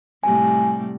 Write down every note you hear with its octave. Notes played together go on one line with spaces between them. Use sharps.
A2 C3 G3 G#5